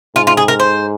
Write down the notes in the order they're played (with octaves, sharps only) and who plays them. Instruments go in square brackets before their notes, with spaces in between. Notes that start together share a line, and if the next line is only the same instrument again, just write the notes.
[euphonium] G#2 [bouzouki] F4
[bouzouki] F4
G#4
A#4
C5